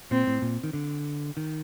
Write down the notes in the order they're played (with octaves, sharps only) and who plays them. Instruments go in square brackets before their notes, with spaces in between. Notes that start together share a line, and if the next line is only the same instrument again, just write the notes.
[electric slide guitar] A#2 [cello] C4
[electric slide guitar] A2
A#2
D#3
D3
D#3